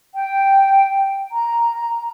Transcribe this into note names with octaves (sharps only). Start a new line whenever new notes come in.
G5
A#5